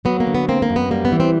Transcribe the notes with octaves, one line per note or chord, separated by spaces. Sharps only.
F#3 B3
A#3
D3
B3
A#3 C4
A#3
F#2
B3
G3 A#3
B3
E3
C4